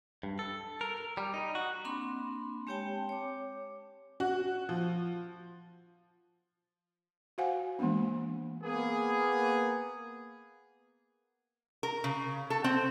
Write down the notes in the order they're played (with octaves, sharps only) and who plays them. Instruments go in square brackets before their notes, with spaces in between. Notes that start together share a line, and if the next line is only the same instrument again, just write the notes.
[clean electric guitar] G2
A4
A#4
G3
D#4
F#4
[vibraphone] A#3 C4 D4 B5 C6
G#3 C4 G4 C#5 G5 A5
C#5 D6
[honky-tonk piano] F#4
F3
[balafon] F#4 C5 F5 F#5 G#5
E3 G#3 A#3 B3 D4
[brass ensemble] A#3 B3 G#4
[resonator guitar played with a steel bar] A#4
C#3
A4
C4